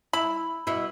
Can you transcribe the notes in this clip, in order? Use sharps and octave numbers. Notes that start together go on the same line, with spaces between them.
E4 B5
B2 E4